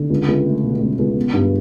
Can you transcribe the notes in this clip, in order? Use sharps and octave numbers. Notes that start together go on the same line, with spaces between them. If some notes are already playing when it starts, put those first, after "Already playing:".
Already playing: D3
C#2
C#2
A3
B2
C#2
C#2
B3
G2